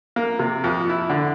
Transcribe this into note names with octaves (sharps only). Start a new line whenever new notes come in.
A#3
C3
F2
E4
D3